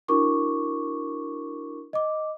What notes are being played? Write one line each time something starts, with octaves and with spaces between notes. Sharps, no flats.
D4 E4 F#4 A#4 C#6 D6
D#5 D6